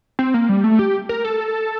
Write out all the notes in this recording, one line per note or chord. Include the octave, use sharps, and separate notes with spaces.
C4
A#3
G3
A3
G4
A#4
A4